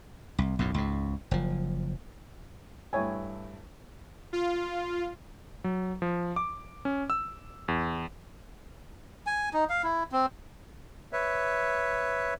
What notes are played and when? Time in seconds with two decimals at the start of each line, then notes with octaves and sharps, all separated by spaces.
0.38 C2
0.59 B1 F#2 A2
0.74 C#2 G#2
1.31 F#1 F3
2.93 G2 A3 E4 C#5 G5 G#5
4.33 F4
5.64 F#3
6.02 F3
6.36 D6
6.85 C#4
7.10 E6
7.68 E2
9.27 G#5
9.54 D#4
9.70 F5
9.84 E4
10.12 C4
11.13 B4 C#5 E5